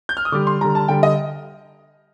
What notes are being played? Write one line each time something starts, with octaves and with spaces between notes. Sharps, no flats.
G6
F6
D#6
D3 G3 D6
C6
D3 G3 A#5
A5
D3 G3 G5
D#5